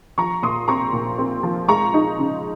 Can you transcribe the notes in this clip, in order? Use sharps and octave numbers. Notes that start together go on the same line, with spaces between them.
F3 A#5 C#6
A#2 C6 D#6
C4 A#5 C#6
A#2
C4
F3
G#3 A#5 C#6
D#4
C#3